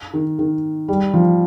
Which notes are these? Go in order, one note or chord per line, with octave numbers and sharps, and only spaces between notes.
D#3
D#3
G3
F3